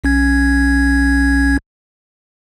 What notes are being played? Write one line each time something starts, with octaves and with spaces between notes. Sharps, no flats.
B1 C#4 G#6